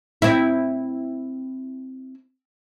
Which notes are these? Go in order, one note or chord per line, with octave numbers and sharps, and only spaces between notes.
C4 E4